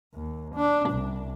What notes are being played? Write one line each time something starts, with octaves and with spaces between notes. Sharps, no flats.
D#2
D4
C2